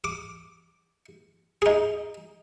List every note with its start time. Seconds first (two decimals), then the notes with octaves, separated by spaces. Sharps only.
0.04 D6
1.62 D#4 G#4